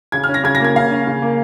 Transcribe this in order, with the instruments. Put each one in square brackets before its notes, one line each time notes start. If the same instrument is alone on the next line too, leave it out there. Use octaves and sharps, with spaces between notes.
[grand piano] C#3 [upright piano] G#6
[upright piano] F6
[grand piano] C#4
[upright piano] A#6
[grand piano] C#3 [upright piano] G#6
[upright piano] A#6
[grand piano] A#3 [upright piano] G#6
[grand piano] C#3 [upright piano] F5
[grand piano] C#4
C#3
A#3